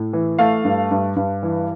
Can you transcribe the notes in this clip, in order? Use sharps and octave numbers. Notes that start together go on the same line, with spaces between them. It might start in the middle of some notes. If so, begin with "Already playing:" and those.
Already playing: A2
E3
A3 F5
G2
G2
G2
E3